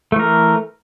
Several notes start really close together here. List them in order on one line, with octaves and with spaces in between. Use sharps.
A3 E3 A#4